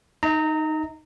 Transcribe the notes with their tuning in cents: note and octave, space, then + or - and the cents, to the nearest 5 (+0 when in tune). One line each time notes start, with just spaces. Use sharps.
D#4 +0 D#5 +45 A#5 -20